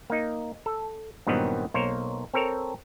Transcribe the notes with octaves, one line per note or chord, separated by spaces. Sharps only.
A#3 D#4
A4
G2 A#2 D#3 F#3 B3 C4
B1 A#3 A#4 C5 C#5
C4 A4 A#4 C#5